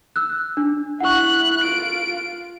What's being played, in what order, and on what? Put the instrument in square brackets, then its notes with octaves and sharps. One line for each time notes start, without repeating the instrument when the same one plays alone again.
[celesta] E6 F#6
D4
[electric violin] E4 F#6 [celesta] F#5 C#6
[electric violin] F4 D7